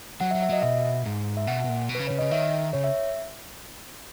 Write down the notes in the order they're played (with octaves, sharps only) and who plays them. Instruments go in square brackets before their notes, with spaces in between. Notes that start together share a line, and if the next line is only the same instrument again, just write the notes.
[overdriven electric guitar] F#3 [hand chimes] F#5
[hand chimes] E5
[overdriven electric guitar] F#3
[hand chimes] E5
[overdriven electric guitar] F#3 [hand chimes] D#5
[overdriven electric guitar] B2 [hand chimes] E5
[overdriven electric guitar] G#2
[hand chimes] E5
[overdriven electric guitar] B2 [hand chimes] F#5
[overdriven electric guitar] B2
A#2
B2
[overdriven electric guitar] C#3 [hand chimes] B4
[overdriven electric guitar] C#3 [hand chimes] C#5
[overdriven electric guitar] C#3 [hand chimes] D#5
[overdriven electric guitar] D#3 [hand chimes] E5
[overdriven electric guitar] C#3 [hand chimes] C#5
[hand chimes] E5